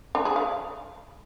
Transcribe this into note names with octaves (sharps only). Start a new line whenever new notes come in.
D4
G#4
F5